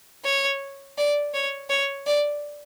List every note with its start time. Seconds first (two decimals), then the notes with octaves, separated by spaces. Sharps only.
0.25 C#5
0.98 D5
1.34 C#5
1.70 C#5
2.07 D5